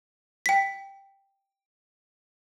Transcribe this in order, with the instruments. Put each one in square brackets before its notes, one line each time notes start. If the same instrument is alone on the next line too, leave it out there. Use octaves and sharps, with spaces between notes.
[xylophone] G5 B6